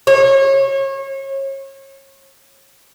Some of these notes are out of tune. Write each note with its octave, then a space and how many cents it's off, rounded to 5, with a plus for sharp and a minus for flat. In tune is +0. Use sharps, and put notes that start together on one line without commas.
C#5 -30